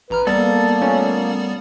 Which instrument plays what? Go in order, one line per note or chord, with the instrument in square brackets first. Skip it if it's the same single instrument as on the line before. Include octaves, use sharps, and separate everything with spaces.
[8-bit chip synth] A1 A#5 F6 [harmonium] B4
[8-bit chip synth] G3 B3 D5 [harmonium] A#3 [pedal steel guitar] A4 A5
[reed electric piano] A3 C#4 F4